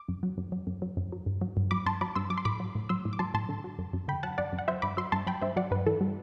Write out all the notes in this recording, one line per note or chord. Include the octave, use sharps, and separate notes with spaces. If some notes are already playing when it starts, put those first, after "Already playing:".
Already playing: D6
F#2
F#3
F#2
F#3
F#2
F#3
F#2
F#3
G2
F#3
G2
F#3 B5 D6
G2 A5 C6
F#3 B5 D6
G2 C6 E6
F#3 D6
C6
A2 B5 D6
F#3
A2
F#3 C6 E6
A2
D6
F#3 A5 C6
A2 A5 C6
D3
F#3
F#2
F#2
D3 G5 B5
F#3 F#5 A5
F#2 D5 F#5
F#2
F#5
F#3 C5 E5
G2 B5 D6
F#3 C6 E6
G2 A5 C6
F#3 G5 B5
G2 C5 E5
F#3 D5 F#5
G2 B4
E3 A4
G3